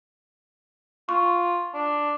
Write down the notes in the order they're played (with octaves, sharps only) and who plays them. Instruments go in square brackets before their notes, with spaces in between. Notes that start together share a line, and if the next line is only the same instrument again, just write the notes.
[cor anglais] F4 [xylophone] C#6
[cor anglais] D4